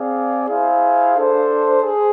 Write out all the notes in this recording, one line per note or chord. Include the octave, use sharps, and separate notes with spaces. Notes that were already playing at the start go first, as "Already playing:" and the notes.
Already playing: C4 G#4 D5 F5
E4 G#4 C5 F5
D4 A4 C5
G#4